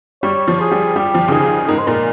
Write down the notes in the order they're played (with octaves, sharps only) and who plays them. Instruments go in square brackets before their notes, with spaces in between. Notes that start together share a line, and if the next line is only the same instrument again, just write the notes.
[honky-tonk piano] G3 [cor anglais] C#5
[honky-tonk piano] F3
[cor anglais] G#4
[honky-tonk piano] G3
[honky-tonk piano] G3 [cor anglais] G4
[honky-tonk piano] F3
C#3
[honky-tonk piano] D#3 [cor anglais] G#4
[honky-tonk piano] G#2 [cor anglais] A#4
[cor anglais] C5
[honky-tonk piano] A#2 [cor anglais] A#4